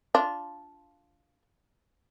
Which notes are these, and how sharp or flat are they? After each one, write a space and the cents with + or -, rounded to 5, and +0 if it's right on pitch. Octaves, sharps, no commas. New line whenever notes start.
D4 -10 F4 +0